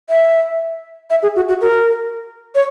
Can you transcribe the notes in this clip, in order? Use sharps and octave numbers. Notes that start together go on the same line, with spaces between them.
E5
E5
G#4
F#4
F#4
A#4
C#5